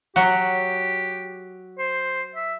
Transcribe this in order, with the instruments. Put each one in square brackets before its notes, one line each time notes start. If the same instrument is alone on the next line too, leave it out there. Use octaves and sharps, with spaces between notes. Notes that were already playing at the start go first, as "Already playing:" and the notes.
[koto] F#3 F#4 [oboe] G4
[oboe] C5
E5